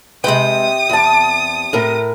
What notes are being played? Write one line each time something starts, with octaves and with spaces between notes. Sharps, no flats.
C3 G#3 B4 G5 D#6
E2 A5
A2 A#4